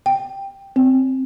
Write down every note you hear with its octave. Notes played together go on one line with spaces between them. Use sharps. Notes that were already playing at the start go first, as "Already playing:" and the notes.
G5
C4